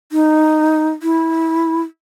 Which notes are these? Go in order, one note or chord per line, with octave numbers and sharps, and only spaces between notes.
D#4
E4